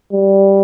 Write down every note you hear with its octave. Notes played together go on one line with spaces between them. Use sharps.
G3